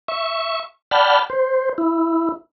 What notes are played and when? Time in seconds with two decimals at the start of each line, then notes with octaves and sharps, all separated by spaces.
0.08 E5 C#6
0.91 D5 F#5 G5 A5 B5 F6
1.30 C5
1.78 E4